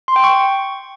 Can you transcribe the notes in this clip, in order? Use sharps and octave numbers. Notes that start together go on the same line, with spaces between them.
C6
G5
C#6